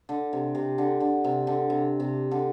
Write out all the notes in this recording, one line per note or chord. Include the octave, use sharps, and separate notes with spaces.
D3
C3
C3
D3
D3
C3
D3
C3
C3
D3